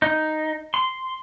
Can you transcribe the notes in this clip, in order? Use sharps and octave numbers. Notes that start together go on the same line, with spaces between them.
D#4
C6